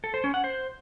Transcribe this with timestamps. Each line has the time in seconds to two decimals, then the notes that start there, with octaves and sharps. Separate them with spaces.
0.04 A4
0.14 C5
0.24 C#4
0.34 F#5
0.44 C5